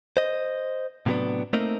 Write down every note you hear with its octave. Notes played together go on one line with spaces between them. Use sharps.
C5 D#5
A2 C3 F#3 G#3 B3 D4
A3 A#3 C4 D#4 A#4 D#5